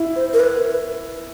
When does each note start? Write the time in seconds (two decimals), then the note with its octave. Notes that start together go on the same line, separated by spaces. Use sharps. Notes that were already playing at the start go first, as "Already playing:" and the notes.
Already playing: E4
0.16 C5
0.34 A#4
0.40 B4